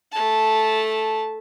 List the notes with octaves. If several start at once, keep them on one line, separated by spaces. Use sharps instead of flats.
A3 A5